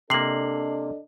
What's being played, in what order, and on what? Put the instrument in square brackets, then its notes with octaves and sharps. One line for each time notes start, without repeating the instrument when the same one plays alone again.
[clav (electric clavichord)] C3 A#3 [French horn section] D4 A4 D#5 [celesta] C7 F#7